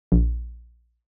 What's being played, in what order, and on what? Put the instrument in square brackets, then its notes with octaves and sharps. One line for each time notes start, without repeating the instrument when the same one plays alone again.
[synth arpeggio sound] A#1